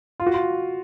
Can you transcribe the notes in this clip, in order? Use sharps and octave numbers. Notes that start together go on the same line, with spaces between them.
F4
F#4
F4